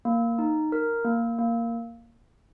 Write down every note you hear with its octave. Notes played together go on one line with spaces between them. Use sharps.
A#3
D#4
A#4
A#3
A#3